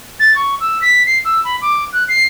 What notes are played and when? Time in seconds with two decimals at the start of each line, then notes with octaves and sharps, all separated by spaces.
0.20 A6
0.36 C#6
0.60 E6
0.82 B6
1.06 C7
1.25 E6
1.44 B5
1.62 D6
1.93 F#6
2.09 C7